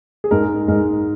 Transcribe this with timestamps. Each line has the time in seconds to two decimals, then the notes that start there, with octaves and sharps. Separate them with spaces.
0.24 G#4
0.31 G#2 G#3 A#4
0.68 G#2 G#3 A#4